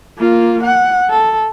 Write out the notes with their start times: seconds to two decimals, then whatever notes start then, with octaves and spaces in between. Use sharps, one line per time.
0.18 A#3 F4
0.63 F#5
1.10 A4